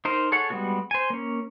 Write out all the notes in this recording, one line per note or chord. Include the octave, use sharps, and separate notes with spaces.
D#4 A#4 C5 D#5
G#4 A4 C#5 F#5
G3 G#3 B3 F#4
C5 G#5
A#3 C#4